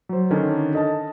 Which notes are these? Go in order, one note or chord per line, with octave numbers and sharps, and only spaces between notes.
F#3 C5
D3 D#3 C#4 D4
A4 D#5 A5